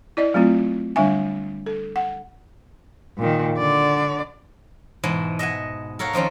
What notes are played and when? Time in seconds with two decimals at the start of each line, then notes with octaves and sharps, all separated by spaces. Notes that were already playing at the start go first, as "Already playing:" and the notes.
0.17 E4 D5 D#5
0.34 F#3 A3 C4 F4
0.96 D3 G3 D4 E5 G#5
1.66 A4
1.96 F#5
3.18 A#2 D#3
3.58 D3 D5
5.04 G#2 B2 E3
5.39 D#5 E5 F#5 G#5
5.99 A4 A#4 C#5 F5 F#5
6.13 D#3 F3 C4 C#4